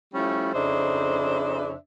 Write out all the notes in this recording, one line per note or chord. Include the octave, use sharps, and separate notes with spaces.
F3 G3 A3 C#4 E4
F2 C#3 D4 D#4 C5 E5